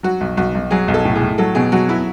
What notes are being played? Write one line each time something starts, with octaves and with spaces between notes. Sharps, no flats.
F#3 F#4
B1
B1 F#4
B1
F#3 G#4
B1
A4
A2
G#4
A2
F#3 A4
B2 G#4
F#3 F#4
B3 E4